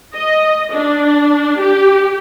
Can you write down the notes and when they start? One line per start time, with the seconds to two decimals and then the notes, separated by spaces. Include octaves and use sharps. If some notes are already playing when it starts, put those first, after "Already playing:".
0.15 D#5
0.74 D4
1.61 G4